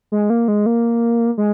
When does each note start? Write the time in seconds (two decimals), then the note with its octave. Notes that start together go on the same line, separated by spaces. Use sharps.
0.12 G#3
0.30 A#3
0.48 G#3
0.66 A#3
1.38 G#3